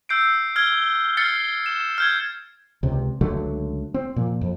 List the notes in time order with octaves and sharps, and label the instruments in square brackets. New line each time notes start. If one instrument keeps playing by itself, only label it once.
[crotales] E6 G6 C7 D7
F6 G#6 G7
F6 A6 C7 C#7
E7
F6 G6 G#6
[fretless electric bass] C#2 C3
C#2 D3 F#3 A3
C4
A#2 F3
F2